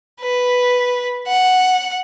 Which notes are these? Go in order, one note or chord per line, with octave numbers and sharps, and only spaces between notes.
B4
F#5